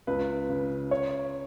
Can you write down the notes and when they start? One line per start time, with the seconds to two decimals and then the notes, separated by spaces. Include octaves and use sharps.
0.07 C#2 B4
0.50 C#3
0.91 C#5